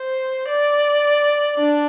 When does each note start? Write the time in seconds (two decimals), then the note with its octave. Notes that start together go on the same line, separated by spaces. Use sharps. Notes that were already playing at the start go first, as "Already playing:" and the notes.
Already playing: C5
0.48 D5
1.58 D4